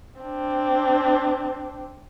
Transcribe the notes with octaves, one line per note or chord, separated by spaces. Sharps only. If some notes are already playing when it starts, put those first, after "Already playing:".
C4 D4